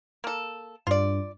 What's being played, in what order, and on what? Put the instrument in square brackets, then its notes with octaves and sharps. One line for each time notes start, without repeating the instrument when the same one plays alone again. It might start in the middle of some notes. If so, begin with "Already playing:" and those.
[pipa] A#3 A4
[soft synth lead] G2 [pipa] F4 D5